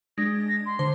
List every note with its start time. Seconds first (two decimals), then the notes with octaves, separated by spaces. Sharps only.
0.18 G#3 D4 A#6
0.66 C6
0.79 D3 C5